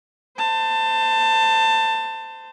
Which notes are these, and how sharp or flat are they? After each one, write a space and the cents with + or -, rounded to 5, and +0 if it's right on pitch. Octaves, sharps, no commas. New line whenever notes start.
C5 -20 A5 +20